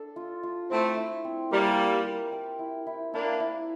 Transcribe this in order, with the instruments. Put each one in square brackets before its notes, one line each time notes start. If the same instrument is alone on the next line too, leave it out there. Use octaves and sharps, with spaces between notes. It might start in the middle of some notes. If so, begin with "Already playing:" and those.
Already playing: [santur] D4 A4
F4
F4
[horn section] A3 C4 [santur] E4
[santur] E4
C4
[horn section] G3 A#3 [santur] A#4
[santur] A#4
A#4
G4
E4
E4
[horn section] A#3 D4 [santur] E4
[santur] E4